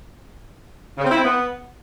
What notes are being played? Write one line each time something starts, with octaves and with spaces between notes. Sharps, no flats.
C#3
C4
E4
C4
B3